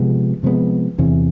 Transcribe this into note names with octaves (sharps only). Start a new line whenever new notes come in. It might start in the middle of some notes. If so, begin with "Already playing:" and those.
Already playing: C3 F3 G#3 B3
C3 F3 G#3 B3
E2 C3 E3